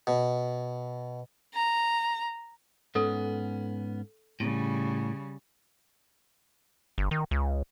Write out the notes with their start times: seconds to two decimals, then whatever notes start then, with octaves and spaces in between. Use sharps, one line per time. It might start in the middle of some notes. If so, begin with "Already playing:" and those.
0.07 B2
1.55 A#5
2.95 G#2 B3 C#4 A4
4.40 A2 C#3 G3
6.98 G1
7.11 D#3
7.31 C#2